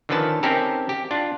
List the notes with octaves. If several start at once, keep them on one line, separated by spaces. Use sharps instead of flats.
D3 D#3 F3 C#4 B4 A5
C4 C#4 D#4 G4 A4 A#4
G4
D4 F4